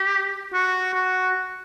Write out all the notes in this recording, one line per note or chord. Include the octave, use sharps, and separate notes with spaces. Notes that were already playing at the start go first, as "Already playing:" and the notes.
Already playing: G4
F#4
F#4